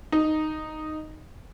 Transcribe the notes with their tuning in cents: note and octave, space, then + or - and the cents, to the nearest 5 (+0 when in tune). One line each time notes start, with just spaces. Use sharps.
D#4 -5